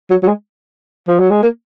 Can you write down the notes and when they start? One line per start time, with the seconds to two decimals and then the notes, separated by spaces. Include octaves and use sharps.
0.10 F#3
0.23 F#3
0.27 G#3
1.08 F3
1.19 F#3
1.30 G#3
1.43 A#3